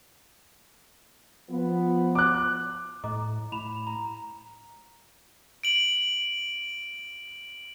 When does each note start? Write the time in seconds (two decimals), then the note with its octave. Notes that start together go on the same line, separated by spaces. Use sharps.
1.50 F3 B3
2.15 D6 F#6
3.04 A2 D#5 A#5 D6
3.52 A2 B5 E7 F7
3.87 A#5
5.63 D7 F#7